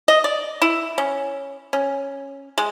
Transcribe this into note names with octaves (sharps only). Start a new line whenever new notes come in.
D#5
D5
E4
C#4
C#4
G#3